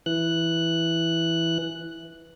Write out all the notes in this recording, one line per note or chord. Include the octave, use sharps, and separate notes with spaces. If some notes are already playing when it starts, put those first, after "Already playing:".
E3 F#6